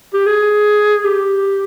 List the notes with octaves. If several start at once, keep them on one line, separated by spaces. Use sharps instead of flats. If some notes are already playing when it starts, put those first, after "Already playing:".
G4
G#4
G4